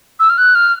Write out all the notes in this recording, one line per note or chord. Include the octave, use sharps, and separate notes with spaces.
E6
F6
F#6
F6